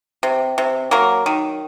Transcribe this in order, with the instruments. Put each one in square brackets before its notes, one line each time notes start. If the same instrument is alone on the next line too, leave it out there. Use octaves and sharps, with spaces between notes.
[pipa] C3
C3
F#3 A#3 A#4
D#3